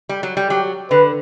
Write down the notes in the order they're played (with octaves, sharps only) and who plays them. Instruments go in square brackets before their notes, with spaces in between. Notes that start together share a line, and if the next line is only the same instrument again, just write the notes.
[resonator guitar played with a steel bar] G3
F#3
G3
[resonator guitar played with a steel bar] F#3 [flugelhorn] G4
[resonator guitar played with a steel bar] D3 [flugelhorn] B4